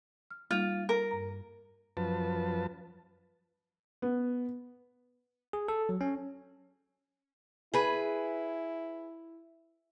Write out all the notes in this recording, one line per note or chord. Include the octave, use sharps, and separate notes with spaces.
F6
G3 A#3 D#4 F4
A#4
G2 A#5
F#2 F3 B4 A5
B3
G#4
A4
F#3
C#4
E4 G#4 B4